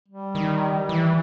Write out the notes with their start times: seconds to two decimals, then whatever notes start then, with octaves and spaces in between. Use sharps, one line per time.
0.08 G3
0.35 D#3
0.89 E3